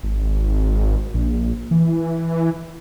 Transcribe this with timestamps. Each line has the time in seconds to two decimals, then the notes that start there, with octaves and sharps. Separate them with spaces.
0.03 G#1
1.14 A#1
1.71 E3